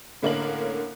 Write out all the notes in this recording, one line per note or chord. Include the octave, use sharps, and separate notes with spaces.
A2 D3 A#3 C#4 A#4 F#7